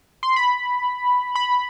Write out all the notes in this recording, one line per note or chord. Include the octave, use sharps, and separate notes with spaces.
C6
B5
B5